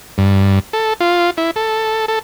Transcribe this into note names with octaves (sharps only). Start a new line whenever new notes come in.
G2
A4
F4
E4
A4
A4